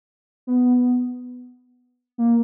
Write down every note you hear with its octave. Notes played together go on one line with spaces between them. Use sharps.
B3
A#3